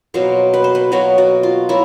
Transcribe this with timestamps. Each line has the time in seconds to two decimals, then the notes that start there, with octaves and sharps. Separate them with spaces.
0.14 B2 F#3 A#3 C5
0.54 B4
0.64 C5
0.75 B4
0.92 B2 F#3 A#3 F#4
1.18 F#4
1.43 F4
1.69 F#3 A#3 E4